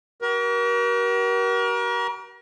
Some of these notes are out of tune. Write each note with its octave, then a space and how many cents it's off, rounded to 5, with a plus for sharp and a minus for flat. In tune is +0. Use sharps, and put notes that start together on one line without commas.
F#4 +45 A#4 +35